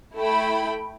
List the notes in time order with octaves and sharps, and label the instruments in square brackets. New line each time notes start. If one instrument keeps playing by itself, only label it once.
[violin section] A3 E4 G5 B5